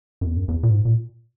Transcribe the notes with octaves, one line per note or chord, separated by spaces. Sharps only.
F#2
E2
F#2
E2
A#2
G#2
A#2